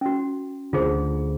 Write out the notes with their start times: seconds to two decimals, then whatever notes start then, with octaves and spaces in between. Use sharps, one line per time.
0.01 C#4 F#4
0.73 D2 D3 F4 G#4 C5